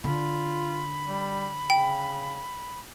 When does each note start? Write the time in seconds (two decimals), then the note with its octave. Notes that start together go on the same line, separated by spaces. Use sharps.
0.04 D3 F4 B5
1.07 G3
1.70 C#3 G5